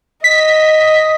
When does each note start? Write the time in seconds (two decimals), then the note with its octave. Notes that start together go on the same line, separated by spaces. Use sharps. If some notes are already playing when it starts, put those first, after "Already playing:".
0.24 D#5 B6